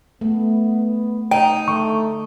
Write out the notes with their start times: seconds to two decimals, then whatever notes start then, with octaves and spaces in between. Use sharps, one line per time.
0.21 A3 B3
1.31 D#4 G5
1.68 D3 A3 C#6